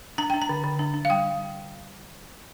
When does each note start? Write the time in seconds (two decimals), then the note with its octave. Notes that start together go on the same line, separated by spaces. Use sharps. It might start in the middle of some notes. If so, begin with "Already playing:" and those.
0.18 D4 A#5
0.30 D4 G5
0.42 A#5
0.49 D3
0.64 D3
0.79 D4
0.94 D4
1.05 F5
1.10 G3 G5